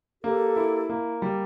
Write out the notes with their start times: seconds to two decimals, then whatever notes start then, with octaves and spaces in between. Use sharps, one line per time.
0.24 A#3 G4 A4
0.56 E4
0.90 A#3
1.22 G3